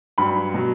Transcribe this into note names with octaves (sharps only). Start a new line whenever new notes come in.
G2 F#3 B5
B2 F#3